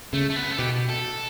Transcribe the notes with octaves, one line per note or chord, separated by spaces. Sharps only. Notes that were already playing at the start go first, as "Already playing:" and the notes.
C#3 A3
A3
B3
A4
B2 G4
A4